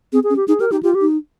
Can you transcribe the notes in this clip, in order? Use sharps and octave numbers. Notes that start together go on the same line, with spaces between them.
C4 G#4
G#4
C#4
G4
D#4 G#4
G4 A#4
D#4 G4
F4 G4
G4
D#4